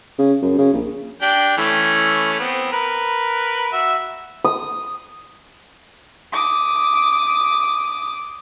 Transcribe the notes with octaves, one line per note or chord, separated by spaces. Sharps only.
C#3
F#2
C#3
A#1
D4 G4 G5
E3 A3 C#4
B3 C4
A#4 B4
F#4 E5
D#6
D6 D#6